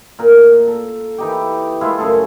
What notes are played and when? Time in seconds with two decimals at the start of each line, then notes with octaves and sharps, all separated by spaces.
0.19 A#2 A#4
0.67 A4
1.18 E3 D#4 G4
1.81 G#3 A3 E4 F4
1.98 F#2 C#3 G#4 A4